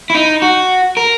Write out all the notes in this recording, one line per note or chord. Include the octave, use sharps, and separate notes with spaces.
E4
D#4
F#4
A#4